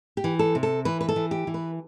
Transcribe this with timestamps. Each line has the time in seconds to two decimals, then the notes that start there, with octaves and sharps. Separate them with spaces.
0.17 G4
0.24 E3
0.39 A4
0.55 C3
0.63 A4
0.85 E3 B4
1.01 B4
1.09 A4
1.16 E3
1.31 G4
1.47 E3
1.54 B4